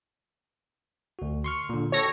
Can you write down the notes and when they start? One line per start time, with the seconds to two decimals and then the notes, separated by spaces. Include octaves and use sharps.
1.19 D2 F#4
1.44 C6 C#6 F6
1.69 A#2 D3
1.92 F#4 A4 C#5 G5 A#6